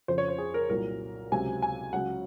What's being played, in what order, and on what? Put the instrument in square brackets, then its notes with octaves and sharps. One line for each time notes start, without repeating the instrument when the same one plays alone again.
[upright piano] F2 C#3 F3 C5
C#5
C5
G#4
A#4
C2 A#2 F#3 A#4
C#2 C3 F#3 G#5
G#5
C#2 C#3 F#3 F#5